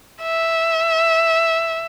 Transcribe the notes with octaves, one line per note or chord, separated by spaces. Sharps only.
E5